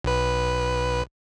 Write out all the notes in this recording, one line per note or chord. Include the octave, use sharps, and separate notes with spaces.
B1 B4